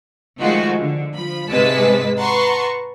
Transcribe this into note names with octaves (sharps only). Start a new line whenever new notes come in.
D#3 F3 G#3 A3 F4 F#4
D3
F3 B5
G#2 C3 G#3 B4 A5 B6
B4 F#5 A5 A#5 C6 C#6